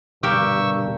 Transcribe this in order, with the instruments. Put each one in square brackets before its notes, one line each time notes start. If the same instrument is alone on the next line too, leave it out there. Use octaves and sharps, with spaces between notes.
[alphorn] G2 [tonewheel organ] B2 D3 G3 [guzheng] G4 A#4 [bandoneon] C#6 E6